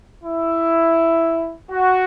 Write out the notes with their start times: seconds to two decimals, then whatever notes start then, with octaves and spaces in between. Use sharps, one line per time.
0.24 E4
1.71 F#4